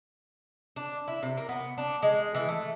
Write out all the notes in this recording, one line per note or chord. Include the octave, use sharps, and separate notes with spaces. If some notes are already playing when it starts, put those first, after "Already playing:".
D4
E4
C3
A#3
B3
D4
G#3
E3
A3